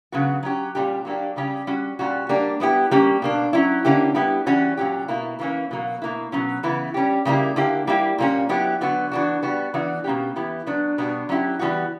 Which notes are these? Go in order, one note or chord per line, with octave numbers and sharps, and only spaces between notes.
C#3 F#3 B3 F#4
F#3 C#4 G4
A#2 G3 C#4 G4
F#3 A#3 D4 G4
C#3 G3 C#4 G4
G3 C#4 F#4
A#2 G3 C#4 F#4
G3 A#3 D4 G4
G3 B3 E4 G4
G3 A#3 C#4 G4
B2 A#3 D4
F#3 C#4 E4
D3 A#3 C#4 E4 G4
G3 B3 E4 G4
E3 G3 C#4 F#4
A#2 F#3 C#4 G4
B2 A#3 E4
E3 A#3 C#4
B2 F#3 A#3
B2 A#3 E4
B2 F#3 C#4
C#3 E3 B3 E4
G3 C#4 G4
C#3 G3 A#3 E4 G4
D3 A#3 E4 G4
G3 A#3 E4 G4
A#2 G3 A#3 C#4
F#3 B3 E4 G4
D3 F#3 B3 F#4
E3 B3 D4 F#4
G3 B3 F#4
E3 B3 D4 F#4
B2 A#3 C#4 G4
E3 B3 E4 G4
F#3 B3 D4
B2 G3 B3 D4 F#4
F#3 C#4 E4 G4
E3 G3 B3 F#4